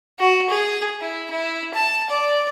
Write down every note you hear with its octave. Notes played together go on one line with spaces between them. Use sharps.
F#4
G#4
E4
E4
A5
D5